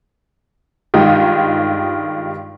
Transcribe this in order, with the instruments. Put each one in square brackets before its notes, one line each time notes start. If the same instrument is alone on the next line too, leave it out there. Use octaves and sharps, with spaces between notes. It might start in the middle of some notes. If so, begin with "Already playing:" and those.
[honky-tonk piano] G2 D#3 G#3 D#4 F4 G4